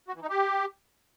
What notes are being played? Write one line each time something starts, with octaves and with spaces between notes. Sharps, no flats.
F#4
E3
D#4
G4